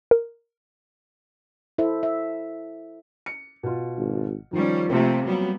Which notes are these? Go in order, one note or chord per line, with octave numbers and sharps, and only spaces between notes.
A#4
E4 A4 C5 E5
E5
C#7
B2 F4
G#1
D#3 F3 G3 C#4
C3 A3 A#3 C4 F4
F#3 G3 A#3 B3